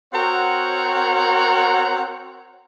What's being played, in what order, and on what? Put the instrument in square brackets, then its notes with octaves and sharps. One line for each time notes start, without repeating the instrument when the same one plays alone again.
[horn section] C4 F#4 A#4 C#5 F#5